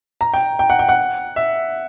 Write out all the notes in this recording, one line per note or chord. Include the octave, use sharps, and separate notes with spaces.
A#5
G5
G5
F#5
G5
F#5
E5